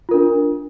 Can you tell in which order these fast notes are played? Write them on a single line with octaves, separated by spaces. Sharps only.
F4 A#4 D4